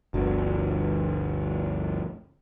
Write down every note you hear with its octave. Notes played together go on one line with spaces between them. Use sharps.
G1 D2